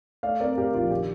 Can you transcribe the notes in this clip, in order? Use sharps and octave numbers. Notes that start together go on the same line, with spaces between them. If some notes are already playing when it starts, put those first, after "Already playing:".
A3 D5 F5
C4 A#4 D5
A2 G4 A#4
A#1 F4
D#3 G4